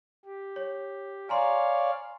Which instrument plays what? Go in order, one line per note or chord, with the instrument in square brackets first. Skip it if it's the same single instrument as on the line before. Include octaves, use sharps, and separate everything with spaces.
[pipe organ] G4
[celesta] C#5
[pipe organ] C#5 D5 F5 [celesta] G#5 A#5 C6